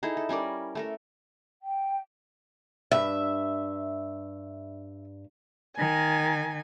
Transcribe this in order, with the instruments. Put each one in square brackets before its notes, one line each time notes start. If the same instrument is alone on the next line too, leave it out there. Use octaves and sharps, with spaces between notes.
[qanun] D#4 E4 G#4 A4
A4
G3 C#4 A#4 D5
A3 A4 A#4
[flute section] G5
[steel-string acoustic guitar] G2 [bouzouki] E5
[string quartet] D#3 G#5